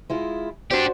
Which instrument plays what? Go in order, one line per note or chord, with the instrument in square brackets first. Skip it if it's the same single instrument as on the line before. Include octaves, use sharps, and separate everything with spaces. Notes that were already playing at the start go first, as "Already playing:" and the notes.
[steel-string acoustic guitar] G#3 E4 F4
[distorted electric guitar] D4 G4 [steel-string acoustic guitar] F#4 C5 D5